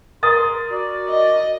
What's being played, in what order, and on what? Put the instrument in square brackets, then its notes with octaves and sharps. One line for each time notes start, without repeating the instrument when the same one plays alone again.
[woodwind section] G#4 C6 [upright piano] A#4 D#6 A6
[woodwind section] F#4 D5
[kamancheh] D#5